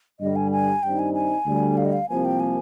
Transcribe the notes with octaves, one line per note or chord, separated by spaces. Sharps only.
G2 D3 G3 D#5
G#5
G#5
G2 D#3 G3 C4 D#4 G5
G#5
G#5
D2 D3 G3
F5
D#5
F5
C2 C3 F3 A#3 G#5
G5
G#5